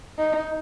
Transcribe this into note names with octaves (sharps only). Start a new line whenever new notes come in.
D#4